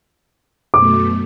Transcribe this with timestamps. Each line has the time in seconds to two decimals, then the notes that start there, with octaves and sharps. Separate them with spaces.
0.74 F#2 B2 A3 D6